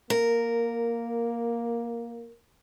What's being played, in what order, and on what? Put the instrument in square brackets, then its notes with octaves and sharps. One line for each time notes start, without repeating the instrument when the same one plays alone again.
[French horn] A#3 [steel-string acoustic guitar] A#4